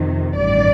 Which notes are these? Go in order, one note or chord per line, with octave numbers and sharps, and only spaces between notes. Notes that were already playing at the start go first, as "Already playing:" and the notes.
Already playing: F2 C3 D#3
A1 G2 D#3 D5